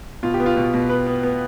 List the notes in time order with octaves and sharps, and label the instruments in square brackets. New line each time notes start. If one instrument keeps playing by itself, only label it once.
[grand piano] B2 F4
G4
B3
F4
B2
B2
B3 B4
B3
B3